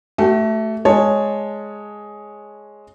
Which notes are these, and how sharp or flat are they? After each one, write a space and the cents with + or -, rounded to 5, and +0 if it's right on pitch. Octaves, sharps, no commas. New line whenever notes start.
A3 +0 F#4 +45
G#3 +5 C#5 +0 A5 +0